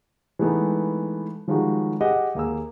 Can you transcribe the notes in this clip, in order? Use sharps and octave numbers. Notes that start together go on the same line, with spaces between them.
E3 G#3 A3 B3 D#4
D#3 F3 G3 G#3 D#4 F#4
G4 G#4 D#5 F#5
D#2 A#3 G#4 E6